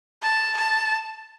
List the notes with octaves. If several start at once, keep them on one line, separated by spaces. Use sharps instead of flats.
A5
A5